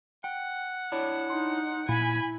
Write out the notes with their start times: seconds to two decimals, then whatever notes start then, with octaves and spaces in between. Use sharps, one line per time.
0.24 F#5 G5
0.92 D4 E4 C#5
1.30 D#4 C6
1.89 A#2 E4 G#5 B5